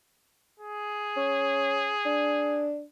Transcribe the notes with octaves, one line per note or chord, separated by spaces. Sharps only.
G#4
C#4
D4